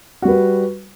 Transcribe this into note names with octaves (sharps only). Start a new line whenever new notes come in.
G3 F#4 B4